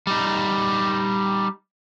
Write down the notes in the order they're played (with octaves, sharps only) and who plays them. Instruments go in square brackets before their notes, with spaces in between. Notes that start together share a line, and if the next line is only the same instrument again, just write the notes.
[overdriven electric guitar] G3 D#4